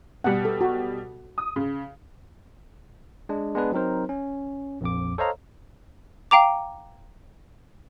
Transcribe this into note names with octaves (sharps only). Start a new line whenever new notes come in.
B2 G3 F#5
A4
F#4
D#6
C#3
G#3 D4
G#3 B3 D4 B4
F#3 C4 D#4 A#4 C5
C#4
A#1 F2 D6
A4 C5 C#5 D#5 F5 A#5
F5 G5 A#5 D6